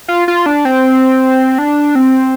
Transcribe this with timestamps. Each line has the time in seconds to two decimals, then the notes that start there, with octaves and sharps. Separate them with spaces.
0.08 F4
0.28 F4
0.46 D4
0.65 C4
1.58 D4
1.95 C4